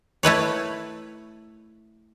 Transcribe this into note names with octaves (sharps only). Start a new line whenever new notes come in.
A3 E4 B4 C#5